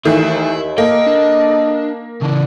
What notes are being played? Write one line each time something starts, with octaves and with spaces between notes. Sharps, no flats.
D#2 D#3 E3 A3 E4
A#3 A4 D#5 G5
D4
C#3 E3 D4